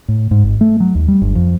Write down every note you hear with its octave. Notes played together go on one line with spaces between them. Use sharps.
A2
G#2
G#1
A3
F#3
D#2
G3
G1
F2